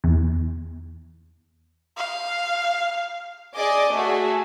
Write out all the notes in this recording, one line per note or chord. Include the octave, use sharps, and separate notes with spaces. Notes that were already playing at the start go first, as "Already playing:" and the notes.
E2
F5
G#4 D5 D#5 D6
A3 F#4 G#4